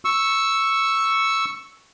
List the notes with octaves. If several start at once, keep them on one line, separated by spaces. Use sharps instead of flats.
C#6 E6